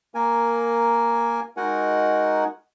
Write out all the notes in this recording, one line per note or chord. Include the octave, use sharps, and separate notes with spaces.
A#3 A#4 G#5
G#3 D#4 F#4 A#4 F#5 G#5